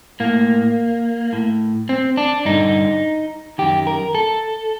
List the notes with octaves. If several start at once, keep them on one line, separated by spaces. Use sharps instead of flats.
A2 A#3
A2
C4
D4
G2 D3 D#4
F#2 D#3 G4
A#4
A4